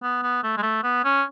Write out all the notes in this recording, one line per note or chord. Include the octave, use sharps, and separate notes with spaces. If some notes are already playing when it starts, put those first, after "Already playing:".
B3
B3
A3
G#3
A3
B3
C#4